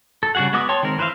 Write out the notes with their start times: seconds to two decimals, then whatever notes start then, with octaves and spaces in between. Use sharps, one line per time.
0.23 A4
0.35 C#3 G3 F#4 G#4 F#5
0.53 G#3 B3 F#4 D6 D#6
0.69 C#5 G5 A5 C6
0.83 D#3 G#3 C4 A#4
0.98 E3 B4 C5 E5 F5